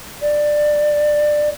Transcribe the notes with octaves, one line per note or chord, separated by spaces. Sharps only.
D5